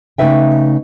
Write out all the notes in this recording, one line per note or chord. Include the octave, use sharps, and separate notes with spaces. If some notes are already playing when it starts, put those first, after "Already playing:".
C#3 A3 D#4 B4 E5 G5